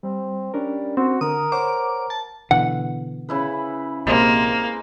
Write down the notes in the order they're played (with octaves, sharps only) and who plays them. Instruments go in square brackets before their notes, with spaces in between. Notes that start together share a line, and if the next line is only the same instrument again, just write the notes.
[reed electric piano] G3 [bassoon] C4
[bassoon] G3 [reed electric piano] C#4 D4 A#4
[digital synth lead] C4 [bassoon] F#4
[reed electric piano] D3 [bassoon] A#4 [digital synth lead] D#6
[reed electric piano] C5 C#5 F#5 [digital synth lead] D6
[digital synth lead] A5
[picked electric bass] B2 D3 E3 [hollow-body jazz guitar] F#5
[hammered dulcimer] C#3 E4 B4
[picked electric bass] A#1 C3 [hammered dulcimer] G#3 C4 [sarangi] A#3